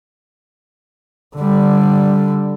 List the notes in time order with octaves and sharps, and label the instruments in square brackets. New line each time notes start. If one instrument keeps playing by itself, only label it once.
[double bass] D3 G3